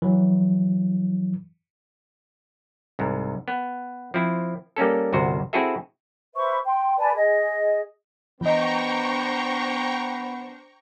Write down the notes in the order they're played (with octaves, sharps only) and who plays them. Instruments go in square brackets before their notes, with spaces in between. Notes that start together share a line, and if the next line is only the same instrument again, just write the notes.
[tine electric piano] E3 F#3
[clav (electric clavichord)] C2 G#2
B3
F3 C4 E4
G3 A#3 C#4 A4
G1 C2 F#4 C5
C4 E4 F#4 G#4 A4 E5
[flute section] B4 C5 E5 C#6
G5 C6
B4 D5 G#5 A5
G#4 D#5
[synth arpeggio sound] E3 D#5 [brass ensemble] B3 [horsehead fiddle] D4 C5 [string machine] G5 A#5 C#6